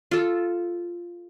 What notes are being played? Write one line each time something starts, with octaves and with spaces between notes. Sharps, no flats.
F4 A4